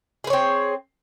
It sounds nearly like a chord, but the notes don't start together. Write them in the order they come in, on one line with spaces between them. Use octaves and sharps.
G#4 B4 C#5 C4